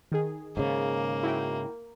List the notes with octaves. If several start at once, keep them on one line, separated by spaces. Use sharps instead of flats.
D#3 G#4
G#2 C#3 A#3
E4 F#4 G5